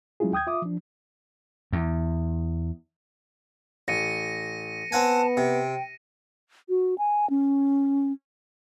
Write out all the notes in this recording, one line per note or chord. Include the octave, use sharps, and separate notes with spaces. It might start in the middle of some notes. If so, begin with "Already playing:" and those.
F#3 G#3 C#4 E4 F4 G#4
D#2 G5 D#6 G6 G#6
F4 E5 D6 D#6
F3 D4
E2
A1 A#6 C#7 D#7
B3 C4 F#5 G#5 A5
C3 G5
F#4
G#5
C#4